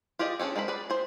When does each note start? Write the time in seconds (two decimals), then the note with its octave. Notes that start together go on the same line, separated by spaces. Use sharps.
0.19 F4 G4 G#4 D5 D#5
0.39 C#4 D4 G#4 A4
0.56 G#3 A#4 C5 B5
0.68 G#4 B4 D5
0.90 G#4 C5